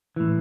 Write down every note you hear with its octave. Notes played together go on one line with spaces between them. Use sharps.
A2 E3